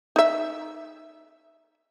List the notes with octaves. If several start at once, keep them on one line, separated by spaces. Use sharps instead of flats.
D#4 E5